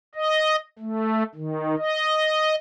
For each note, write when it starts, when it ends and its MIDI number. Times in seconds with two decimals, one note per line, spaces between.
0.15 0.56 75
0.79 1.23 57
1.35 1.75 51
1.78 2.55 75